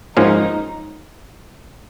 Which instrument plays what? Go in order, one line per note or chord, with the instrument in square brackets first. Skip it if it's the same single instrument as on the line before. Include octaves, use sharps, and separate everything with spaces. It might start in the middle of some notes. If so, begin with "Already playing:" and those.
[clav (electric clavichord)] G#2 F3 A#3 C#4 F4 [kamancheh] D#4